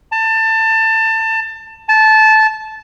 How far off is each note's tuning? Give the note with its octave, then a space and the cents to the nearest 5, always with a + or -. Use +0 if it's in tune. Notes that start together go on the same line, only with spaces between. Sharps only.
A5 +25
A5 -15